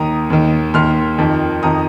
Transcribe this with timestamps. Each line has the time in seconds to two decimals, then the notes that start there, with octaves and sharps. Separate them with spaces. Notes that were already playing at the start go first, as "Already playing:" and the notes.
Already playing: D#2 D#3 A#5 D#6
0.30 D#2 D#3
0.74 D#2 D#3 C6 F6
1.18 F2 D#3
1.63 F2 D#3 A#5 D#6